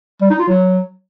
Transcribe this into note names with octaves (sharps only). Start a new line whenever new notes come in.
G3
D#4
F4
F#3